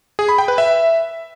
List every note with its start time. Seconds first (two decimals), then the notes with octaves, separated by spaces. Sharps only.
0.19 G#4
0.29 B5
0.38 G5
0.48 B4
0.58 E5